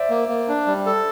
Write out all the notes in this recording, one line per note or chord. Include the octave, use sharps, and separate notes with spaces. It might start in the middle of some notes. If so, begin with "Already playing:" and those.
Already playing: C5 D5 E5
A#3
A#3
D4
G3
A4